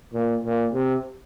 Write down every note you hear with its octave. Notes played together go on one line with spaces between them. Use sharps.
A#2
A#2
C3